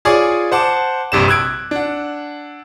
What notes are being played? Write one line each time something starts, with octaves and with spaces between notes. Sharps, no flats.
F4 G#4 C#5 D5 G#5 D6
C5 F#5 A5 D6
A#1 G2 C3 E7
E6 F#6 G#6 D7
D4 F#5